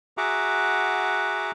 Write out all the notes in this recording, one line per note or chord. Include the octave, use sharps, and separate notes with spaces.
F#4 G#4 E5 F#5 A#5 D6